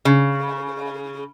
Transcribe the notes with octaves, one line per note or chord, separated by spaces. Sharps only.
C#3